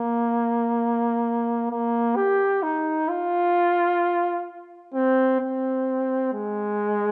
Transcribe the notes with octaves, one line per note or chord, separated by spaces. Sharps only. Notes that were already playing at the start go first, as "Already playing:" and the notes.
Already playing: A#3
A#3
G4
D#4
F4
C4
C4
G#3